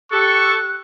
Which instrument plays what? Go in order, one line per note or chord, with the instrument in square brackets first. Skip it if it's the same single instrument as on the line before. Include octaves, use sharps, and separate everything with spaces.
[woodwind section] G4 A4 [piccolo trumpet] C#6 [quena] F#6